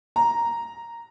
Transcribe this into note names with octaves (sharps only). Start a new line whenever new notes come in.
A#5